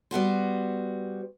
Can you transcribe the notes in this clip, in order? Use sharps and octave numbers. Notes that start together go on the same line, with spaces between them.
G3 B3 F#4 C5